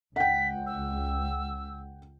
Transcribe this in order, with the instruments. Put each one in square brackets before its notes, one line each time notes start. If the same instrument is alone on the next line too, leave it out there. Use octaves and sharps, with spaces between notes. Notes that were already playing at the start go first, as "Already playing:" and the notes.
[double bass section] C#2 [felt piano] F#5 G5 [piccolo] B6
[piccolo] E6